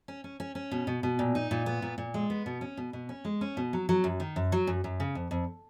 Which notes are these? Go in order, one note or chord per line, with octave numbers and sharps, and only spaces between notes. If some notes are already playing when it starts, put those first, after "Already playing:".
C#4
C#4
C#4
C#4
B2
B2
B2
A#2
D#4
A#2
B3
A#2
A#2
G#3
B3
B2
C#4
B2
B2
C#4
G#3
C#4
B2
F#3
F#3
F#2
D#3
F#2
F#3
F#2
F#2
C#3
F2
F2